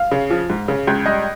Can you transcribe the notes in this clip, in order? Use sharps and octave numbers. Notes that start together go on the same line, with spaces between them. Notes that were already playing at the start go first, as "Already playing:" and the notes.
Already playing: F5
C#3
F3
G#2
C#3
C#2
G3 D#5